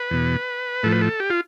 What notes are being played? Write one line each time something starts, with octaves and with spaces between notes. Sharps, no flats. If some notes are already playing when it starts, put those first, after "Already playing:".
Already playing: B4
E2 B2
A2 F3 A4
B4
A4
G4
F4